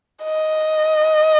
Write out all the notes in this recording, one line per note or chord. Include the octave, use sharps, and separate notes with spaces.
D#5